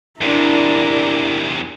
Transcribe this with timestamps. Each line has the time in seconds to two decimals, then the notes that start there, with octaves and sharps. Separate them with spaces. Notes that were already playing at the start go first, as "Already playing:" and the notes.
0.21 E2 C3 D4 E4 A#4